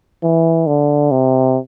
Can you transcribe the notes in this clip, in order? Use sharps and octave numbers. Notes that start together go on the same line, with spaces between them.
E3
D3
C3